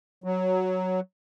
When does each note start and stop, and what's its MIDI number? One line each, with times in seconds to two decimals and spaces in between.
0.24 1.00 54